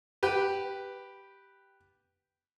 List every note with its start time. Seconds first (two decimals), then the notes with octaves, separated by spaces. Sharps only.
0.23 G4 B4